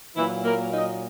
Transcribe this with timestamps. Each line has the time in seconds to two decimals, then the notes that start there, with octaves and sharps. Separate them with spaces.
0.16 A#2 E3 E4
0.21 F#3
0.45 A#3 A#4
0.73 D#4 D#5